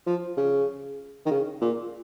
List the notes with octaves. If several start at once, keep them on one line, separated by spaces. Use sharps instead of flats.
F3
C#3
D#3
C#3
A#2